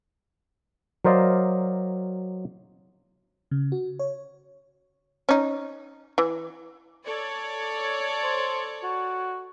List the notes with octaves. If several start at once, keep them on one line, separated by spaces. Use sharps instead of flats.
F#3 A#4 C5 D5 D#5 F5
C#3
F#4
C#5
C#4 D#4
E3
A4 C#5 D5
C5
F#4